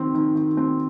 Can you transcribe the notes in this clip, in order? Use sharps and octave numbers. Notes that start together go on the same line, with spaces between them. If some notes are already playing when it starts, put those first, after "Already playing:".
Already playing: D#3 C4
D#3
D#3
C4